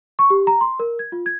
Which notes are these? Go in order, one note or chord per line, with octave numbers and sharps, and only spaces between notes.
C#6
G4
A#5
C6
A#4
G#6
F4
G#6